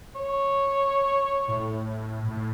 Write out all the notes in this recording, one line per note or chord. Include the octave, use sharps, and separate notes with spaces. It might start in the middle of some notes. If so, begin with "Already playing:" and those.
C#5
A2
A2